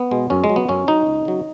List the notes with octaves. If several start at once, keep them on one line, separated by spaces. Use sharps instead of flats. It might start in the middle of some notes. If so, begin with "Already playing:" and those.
Already playing: B3
B2 G#3
F#2 C#4
G#3
F#3
B3
F#2 C#4
F#3 D#4
C#2
C#3 F#3